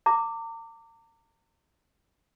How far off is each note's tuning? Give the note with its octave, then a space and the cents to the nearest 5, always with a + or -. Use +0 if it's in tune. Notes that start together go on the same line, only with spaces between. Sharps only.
A#5 -40 D6 +0